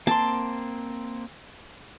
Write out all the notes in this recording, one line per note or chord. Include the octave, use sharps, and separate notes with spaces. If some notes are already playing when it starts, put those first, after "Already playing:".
A#3 C4 A5 C6